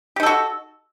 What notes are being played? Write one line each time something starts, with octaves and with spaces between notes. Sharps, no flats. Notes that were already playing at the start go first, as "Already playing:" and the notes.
D#4 F#4 G4 A4